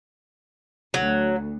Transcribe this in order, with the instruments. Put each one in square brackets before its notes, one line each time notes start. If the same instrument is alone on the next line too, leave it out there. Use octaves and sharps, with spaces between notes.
[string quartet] D2 [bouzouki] F#3